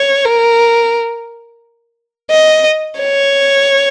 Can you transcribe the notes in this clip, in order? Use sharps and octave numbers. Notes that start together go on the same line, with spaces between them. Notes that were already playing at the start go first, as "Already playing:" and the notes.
Already playing: C#5
A#4
D#5
C#5